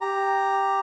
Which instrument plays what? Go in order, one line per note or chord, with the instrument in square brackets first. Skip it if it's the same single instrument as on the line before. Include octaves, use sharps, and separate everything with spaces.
[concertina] G4 A#5